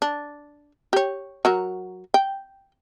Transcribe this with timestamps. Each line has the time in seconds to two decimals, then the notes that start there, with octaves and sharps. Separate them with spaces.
0.02 D4
0.93 G4 C#5
1.45 F#3 F#4 A#4
2.14 G5